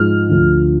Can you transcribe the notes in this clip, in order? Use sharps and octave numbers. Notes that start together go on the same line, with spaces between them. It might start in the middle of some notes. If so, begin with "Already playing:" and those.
Already playing: G#2 F3 F6
D2 D3 F3